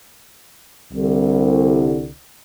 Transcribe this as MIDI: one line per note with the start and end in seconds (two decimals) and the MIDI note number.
0.93 2.10 36
0.93 2.10 50